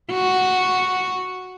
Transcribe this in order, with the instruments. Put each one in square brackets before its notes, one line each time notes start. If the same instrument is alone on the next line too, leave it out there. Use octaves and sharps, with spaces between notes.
[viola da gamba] F#4